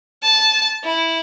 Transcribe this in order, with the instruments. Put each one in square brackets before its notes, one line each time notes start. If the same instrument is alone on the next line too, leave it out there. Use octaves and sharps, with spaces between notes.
[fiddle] A5
E4